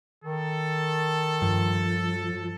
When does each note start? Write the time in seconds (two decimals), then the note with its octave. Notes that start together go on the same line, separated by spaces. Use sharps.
0.24 D#3 A4
1.42 G2 F3